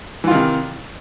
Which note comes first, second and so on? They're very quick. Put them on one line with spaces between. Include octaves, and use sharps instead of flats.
E3 F4 D#3 C3